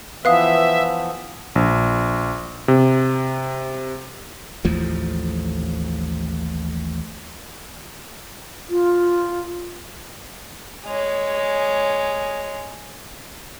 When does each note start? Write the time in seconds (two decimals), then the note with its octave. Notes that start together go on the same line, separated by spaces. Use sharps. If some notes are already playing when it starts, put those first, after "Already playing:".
0.25 E3 F3 B3 B4 E5 F5 D#6
1.55 A#1
2.68 C3
4.65 A1 D#2 A2 F3
8.70 F4
10.86 G#3 C#5